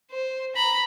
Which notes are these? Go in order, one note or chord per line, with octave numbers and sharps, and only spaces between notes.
C5
A#5 B5